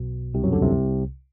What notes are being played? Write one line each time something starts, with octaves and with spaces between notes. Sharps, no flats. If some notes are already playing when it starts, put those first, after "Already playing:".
Already playing: B1 B2
C2 C3
F#2 F#3
D2 D3
C2 C3